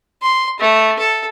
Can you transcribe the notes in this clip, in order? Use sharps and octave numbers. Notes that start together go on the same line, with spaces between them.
C6
A3
A4